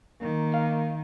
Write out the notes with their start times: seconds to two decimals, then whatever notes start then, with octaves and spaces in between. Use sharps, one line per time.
0.21 D#3 A#3
0.54 F5